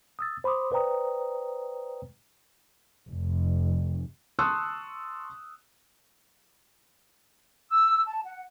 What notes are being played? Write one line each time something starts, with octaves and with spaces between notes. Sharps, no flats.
D#6 E6 A6
C5 B5 C6 D6 D#6
B4 C5 D5 G5 A#5 D#6
F1
A5 C6 C#6 D#6 E6 F#6
E6
A5
F#5